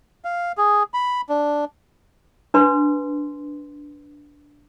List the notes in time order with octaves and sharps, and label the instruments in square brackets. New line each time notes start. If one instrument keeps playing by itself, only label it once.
[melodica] F5
G#4
B5
D4
[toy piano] D4 B4 C6